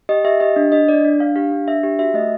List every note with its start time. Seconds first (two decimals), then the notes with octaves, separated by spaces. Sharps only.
0.09 G4 D#5
0.25 G4 E5
0.40 G4 D#5
0.56 D4
0.72 D4 D#5
0.89 D4 D5
1.05 D4
1.19 D4 F5
1.36 G4 F5
1.52 D4
1.68 D4 E5
1.83 G4
1.99 F#4 E5
2.14 A3 D#5